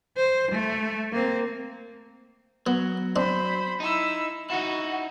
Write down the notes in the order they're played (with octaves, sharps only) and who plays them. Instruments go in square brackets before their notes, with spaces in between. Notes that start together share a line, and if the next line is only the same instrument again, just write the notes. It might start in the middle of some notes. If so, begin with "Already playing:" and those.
[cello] C5
A3
A#3 C4
[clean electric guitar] F#3 [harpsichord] B3
[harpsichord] C4 D4 [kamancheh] C5 B5
[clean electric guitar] D#4 [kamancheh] E4 E6
[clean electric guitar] D#4 E4 [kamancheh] F#4